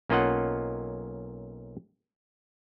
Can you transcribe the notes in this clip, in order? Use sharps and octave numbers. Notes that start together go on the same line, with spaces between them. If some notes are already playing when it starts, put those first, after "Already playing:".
B1 A#3 C#4 F4 D#5 F#5